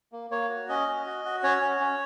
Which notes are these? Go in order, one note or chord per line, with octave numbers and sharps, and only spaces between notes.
A#3
A#3 C#5
F#4
C#4 D#5
F#4
F#4
F#4
C#4 C#5
C#4
C#4